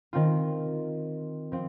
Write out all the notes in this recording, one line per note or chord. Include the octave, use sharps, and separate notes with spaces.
D#3 C4 F4
F3 C4